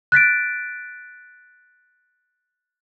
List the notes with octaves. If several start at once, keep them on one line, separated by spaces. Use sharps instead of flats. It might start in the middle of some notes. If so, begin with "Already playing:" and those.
F#6 A6 B6 D7